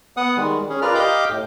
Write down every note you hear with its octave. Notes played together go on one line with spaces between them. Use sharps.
B3 F#5 D#6
D#3 G3 G#3
C#4 G#4
F4 A#4 B4 D5 F6
G4 D#5 F5 G5 D6 G6
A2